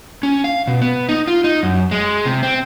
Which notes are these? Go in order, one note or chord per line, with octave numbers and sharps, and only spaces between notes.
C#4
F5
B2
B3
D#4
F4
D#4
F#2
G#3
C3
C4